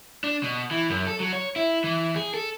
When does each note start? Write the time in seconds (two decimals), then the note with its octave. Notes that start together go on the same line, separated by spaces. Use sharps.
0.24 D4
0.43 B2
0.71 E3
0.90 F#2
1.07 A4
1.20 F#3
1.33 C#5
1.56 E4
1.84 E3
2.16 G#4
2.34 A4